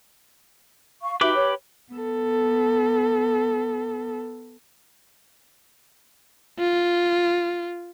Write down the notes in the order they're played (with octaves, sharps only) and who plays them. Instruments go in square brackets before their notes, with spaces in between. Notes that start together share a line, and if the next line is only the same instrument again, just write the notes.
[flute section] F5 C#6
[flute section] D#4 F#4 E5 [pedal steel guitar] G4 B4 D6
[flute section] C#5
[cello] B3 A4
[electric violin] F4